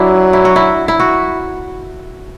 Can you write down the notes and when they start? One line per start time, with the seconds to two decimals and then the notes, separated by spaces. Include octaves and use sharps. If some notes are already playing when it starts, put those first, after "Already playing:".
Already playing: F#3 D4 E4
0.33 E4
0.45 F#4
0.56 E4
0.88 E4
1.00 F#4